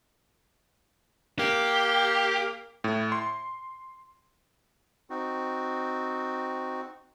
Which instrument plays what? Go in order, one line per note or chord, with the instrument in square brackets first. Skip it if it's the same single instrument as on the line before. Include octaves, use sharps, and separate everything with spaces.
[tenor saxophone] A#3 [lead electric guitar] G4
[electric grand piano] A2
C6
[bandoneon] C4 D#4 F#4